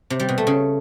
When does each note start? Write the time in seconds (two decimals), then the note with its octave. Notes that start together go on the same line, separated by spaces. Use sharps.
0.10 C3
0.19 G3
0.29 B2
0.38 A3
0.47 C#3